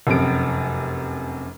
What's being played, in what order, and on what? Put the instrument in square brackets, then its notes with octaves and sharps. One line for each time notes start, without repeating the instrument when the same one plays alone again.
[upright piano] F1 F#2 C3 D7